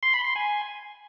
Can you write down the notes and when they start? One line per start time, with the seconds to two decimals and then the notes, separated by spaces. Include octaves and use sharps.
0.03 C6
0.14 B5
0.25 C6
0.36 G#5